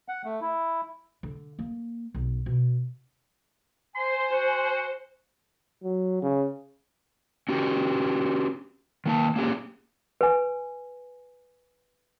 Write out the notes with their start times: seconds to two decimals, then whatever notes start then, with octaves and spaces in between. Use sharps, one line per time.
0.08 F#5
0.25 A3
0.41 E4
1.23 D3
1.59 A#3
2.15 B1
2.46 B2
3.95 C5 G#5 C6
4.32 F#4
5.83 F#3
6.22 C#3
7.49 C#4 F#4 G4
9.06 D#3 A#3 A5
9.36 A#3 C#4 G4 G#4
10.21 B4 G#5